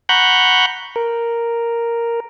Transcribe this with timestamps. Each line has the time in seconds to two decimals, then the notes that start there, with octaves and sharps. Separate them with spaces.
0.09 F#5 A#5 B5 C#6 F#6 G6
0.96 A#4